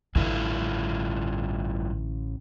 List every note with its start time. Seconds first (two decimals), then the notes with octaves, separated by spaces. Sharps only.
0.15 A1 G2 D3 E4 F4